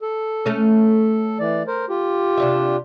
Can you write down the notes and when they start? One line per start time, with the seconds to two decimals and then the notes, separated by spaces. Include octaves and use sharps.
0.01 A4
0.46 A3 C#4
1.39 E3 D5
1.67 A#4 C5
1.89 F4 G4
2.37 C3 D4 E5